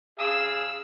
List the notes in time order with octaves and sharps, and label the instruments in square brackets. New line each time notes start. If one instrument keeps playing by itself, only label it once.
[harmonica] G#4 F5 [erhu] E6